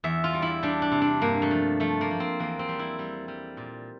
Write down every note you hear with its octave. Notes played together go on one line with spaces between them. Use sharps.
E2 E5
F4
G3
E4
G3 D4
D4
C3
D4
G2 A#3
A3
F3
F3 A3
A#3
F3
C4
E2 A#3
C4
G3
E4
G3
G3
A#2